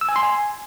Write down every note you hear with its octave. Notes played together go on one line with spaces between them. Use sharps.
E6
G#5
C6
G#5